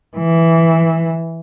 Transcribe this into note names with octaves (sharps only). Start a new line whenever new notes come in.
E3